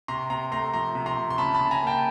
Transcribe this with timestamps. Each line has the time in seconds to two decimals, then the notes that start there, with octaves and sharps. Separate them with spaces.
0.08 C3 A#5 C6
0.30 C3 A#5 C6
0.51 A3 A#5 C6
0.74 F3 A#5 C6
0.95 C3
1.06 A#5 C6
1.17 C3
1.30 C6
1.38 C#3 A5 B5
1.55 A5 B5
1.60 C#3
1.71 G#5 A#5
1.82 A#3
1.87 G5 A5